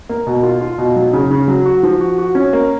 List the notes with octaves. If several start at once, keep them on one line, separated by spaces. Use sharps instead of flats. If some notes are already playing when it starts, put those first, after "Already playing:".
A#3
B2
F4
F4
B2
F#3
C#3
C#3
F#3
F#4
F3
F#4
F#4
C#4
A#3